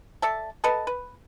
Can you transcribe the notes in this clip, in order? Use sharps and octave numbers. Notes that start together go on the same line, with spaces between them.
A4 D5 E5 A5
A4 B4 D#5 A5
B4